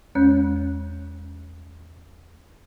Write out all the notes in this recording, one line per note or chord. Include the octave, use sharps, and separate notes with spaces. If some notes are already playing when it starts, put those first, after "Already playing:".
E2 G#3 C#4 C#5 F#6 G6